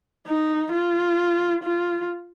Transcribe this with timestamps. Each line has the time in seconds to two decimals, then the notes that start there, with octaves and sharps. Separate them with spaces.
0.27 D#4
0.72 F4
1.63 F4